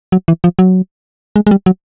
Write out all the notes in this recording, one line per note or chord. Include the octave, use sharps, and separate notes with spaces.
F#3
E3
F3
F#3
G#3
G#3
G3
F#3